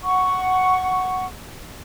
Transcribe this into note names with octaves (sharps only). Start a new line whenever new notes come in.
F#5 C#6